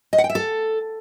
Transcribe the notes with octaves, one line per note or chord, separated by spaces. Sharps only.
D#5
F#5
G5
E5
A4